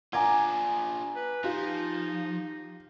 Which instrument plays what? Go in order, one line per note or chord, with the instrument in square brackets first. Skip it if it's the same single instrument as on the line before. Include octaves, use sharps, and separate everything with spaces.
[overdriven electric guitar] D4 F4 [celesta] F#5 G#5 [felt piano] A#5 D6 G#6
[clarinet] B4
[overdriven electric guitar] F3 [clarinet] D#4 [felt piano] F4 G4